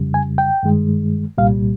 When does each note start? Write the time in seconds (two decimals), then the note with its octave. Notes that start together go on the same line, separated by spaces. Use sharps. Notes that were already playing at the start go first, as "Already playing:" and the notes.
Already playing: F2 C#3 G3
0.14 G#5
0.38 G5
0.63 G2 D#3 G#3
1.38 C2 A#2 G3 F5